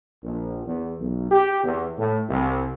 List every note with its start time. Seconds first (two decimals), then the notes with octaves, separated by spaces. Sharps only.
0.23 A#1
0.66 E2
1.00 B1
1.32 G4
1.64 E2
1.98 A2
2.29 C2